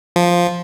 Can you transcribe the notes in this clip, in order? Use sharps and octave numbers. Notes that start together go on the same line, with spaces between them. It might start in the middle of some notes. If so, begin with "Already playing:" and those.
F3